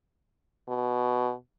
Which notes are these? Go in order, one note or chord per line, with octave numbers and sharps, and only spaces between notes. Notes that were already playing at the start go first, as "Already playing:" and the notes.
B2